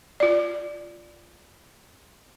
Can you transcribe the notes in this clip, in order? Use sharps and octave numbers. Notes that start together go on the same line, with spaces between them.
F4 D5